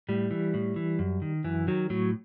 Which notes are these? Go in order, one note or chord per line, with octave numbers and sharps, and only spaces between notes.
A2 G3
E3
A2
E3
F#2
D#3
F#2 E3
D#3 F#3
A2 F#3